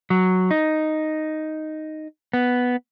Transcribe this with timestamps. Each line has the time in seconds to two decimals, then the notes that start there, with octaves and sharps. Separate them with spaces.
0.10 F#3
0.51 D#4
2.33 B3